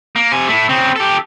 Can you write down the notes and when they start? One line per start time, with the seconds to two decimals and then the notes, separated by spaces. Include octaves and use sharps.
0.16 A#3
0.32 C3 G#5
0.48 A3 E4
0.69 C#3 C4
0.96 G4 A4